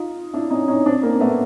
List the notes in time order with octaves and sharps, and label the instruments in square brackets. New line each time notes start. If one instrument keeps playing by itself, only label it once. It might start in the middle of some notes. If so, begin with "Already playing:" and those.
Already playing: [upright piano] D#4 F4
D4 E4
C#4 D#4
C#4 D#4
C4 D4
A#3 C4
A3 B3